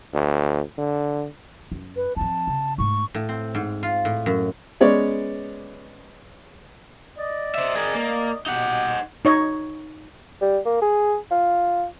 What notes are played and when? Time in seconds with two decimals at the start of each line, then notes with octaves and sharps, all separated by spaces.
0.14 D2
0.78 D3
1.72 F#2
1.96 B4
2.16 F3 C4 A5
2.47 C#3
2.78 G#2 A3 C#6
3.15 A2
3.29 C4
3.55 G#2
3.83 F4
4.05 A2
4.26 F#2
4.81 G#3 B3 C#4 C#5 D5
7.17 D5 D#5
7.55 C5 E5
7.75 G#4 A#4
7.95 A#3
8.46 B2 B3 D#4 G4 F#5
9.25 D#4 C#5 D#5
10.41 G3
10.65 A#3
10.82 G#4
11.31 F4